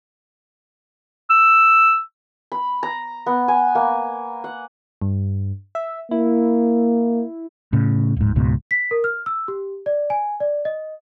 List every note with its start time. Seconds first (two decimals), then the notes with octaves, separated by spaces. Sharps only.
1.30 E6
2.52 B5
2.83 A#5
3.26 B3
3.48 G#5
3.75 A#3
4.44 F#5
5.02 G2
5.75 E5
6.11 A#3 E4
7.73 A2 C#3
8.16 D1 G#2
8.36 C#2 G#2 B2
8.71 B6
8.91 A#4
9.04 F6
9.26 E6
9.48 G4
9.86 D5
10.10 G#5
10.40 D5
10.65 D#5